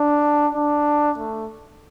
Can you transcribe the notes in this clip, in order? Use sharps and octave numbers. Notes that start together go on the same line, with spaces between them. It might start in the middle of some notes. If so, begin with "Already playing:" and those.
Already playing: D4
D4
A3